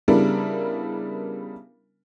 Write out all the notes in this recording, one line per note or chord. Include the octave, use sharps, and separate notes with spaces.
C#3 G3 B3 D4 E4 A#4